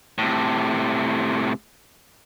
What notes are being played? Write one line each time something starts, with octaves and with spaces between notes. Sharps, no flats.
A2 C3